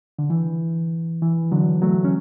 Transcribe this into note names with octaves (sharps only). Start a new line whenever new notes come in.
D3
E3
E3
D3 F#3
F#3 A3
C#4